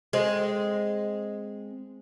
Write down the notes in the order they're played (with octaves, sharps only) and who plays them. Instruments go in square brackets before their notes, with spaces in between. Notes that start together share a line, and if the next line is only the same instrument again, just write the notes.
[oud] G#3 C4